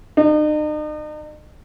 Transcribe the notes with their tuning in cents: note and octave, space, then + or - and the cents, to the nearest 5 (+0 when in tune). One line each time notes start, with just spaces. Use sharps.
D#4 -40